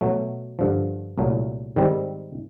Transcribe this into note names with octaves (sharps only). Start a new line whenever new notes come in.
B2 F#3 A3
G2 D3 F3
C2 A#2 F#3 A3
G#2 D#3 G3 C4